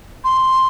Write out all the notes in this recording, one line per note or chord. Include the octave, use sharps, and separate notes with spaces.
C6